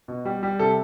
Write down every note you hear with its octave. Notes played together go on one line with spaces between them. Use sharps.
B2
G3
G3
C3 A4